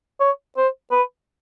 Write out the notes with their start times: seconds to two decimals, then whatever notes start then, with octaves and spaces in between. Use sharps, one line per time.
0.20 C#5
0.57 C5
0.91 B4